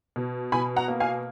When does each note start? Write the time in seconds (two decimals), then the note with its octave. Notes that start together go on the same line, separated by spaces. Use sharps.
0.16 B2
0.52 B2 G#5 B5
0.76 F#5 A#5
0.88 A#3
1.00 F5 G#5